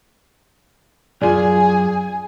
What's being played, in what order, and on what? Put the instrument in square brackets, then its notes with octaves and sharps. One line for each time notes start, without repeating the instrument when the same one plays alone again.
[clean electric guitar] B1 F#2 [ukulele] F4 D5 [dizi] G#4 [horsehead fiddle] G#5